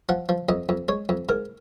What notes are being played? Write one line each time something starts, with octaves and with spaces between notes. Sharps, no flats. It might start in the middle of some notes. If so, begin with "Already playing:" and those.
F3 F#5
F3
F2 D#5
F2
G#3 C#5
F2
G#2 A#4